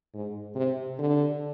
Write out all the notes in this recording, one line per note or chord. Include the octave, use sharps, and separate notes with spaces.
G#2
C3
D3